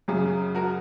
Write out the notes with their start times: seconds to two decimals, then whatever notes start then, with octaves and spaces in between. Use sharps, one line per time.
0.08 F#2 C#3 F#3 G#4
0.55 F#4 A#4